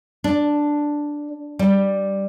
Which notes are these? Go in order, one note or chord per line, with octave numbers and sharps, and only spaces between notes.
D4
G3